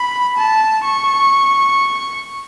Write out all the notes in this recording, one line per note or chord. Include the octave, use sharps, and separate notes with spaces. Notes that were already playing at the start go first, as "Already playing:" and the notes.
Already playing: B5
A5
C#6